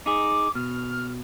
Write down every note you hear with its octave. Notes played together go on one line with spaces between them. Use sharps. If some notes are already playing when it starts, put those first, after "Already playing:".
D#4 G#4 D6
B2 F6